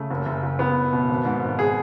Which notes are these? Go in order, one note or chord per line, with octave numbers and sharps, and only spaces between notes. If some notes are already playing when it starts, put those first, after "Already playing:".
Already playing: C#3 A3
F#1
F#1
F#1
F#1 B3
F#1
B2
G#1
G#2
G#1
G#4